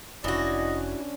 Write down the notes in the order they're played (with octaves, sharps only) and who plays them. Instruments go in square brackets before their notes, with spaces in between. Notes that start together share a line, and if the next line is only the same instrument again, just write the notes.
[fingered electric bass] F1 [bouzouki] E3 F#4 [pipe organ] C#4 D4 [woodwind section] E4 D5 D#5